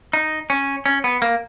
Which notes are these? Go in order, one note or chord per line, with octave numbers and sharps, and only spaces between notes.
D#4
C#4
C#4
B3
A#3